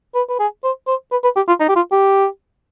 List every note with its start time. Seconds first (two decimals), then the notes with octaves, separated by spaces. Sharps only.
0.15 B4
0.29 B4
0.39 G#4
0.64 C5
0.87 C5
1.11 B4
1.23 B4
1.36 G4
1.48 F4
1.60 D#4
1.69 G4
1.76 F4
1.92 G4